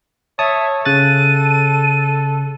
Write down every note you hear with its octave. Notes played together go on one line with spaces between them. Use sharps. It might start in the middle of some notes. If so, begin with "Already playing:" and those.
C#5 E5 A5 D#6
C#3 A4 F#6 A6 D#7